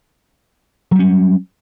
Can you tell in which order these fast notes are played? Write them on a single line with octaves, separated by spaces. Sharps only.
F#3 G3 C#4